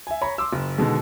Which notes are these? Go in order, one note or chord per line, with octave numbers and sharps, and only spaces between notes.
E5 G#5
C#5 A#5 B5
C6 D6 E6
F#1
B2 D3 D#3 G#3